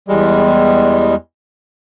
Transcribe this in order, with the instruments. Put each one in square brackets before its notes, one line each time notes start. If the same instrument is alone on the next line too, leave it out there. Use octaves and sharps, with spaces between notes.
[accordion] E2 G3 G#3